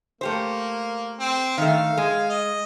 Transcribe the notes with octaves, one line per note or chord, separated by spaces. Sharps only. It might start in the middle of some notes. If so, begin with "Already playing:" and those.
A3 A#3 G4 C5
C4
D#3 A3 F5
G#3
D#5